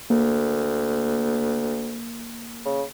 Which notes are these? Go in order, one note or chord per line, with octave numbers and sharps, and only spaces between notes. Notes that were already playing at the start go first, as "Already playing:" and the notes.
D2 A#3
C#3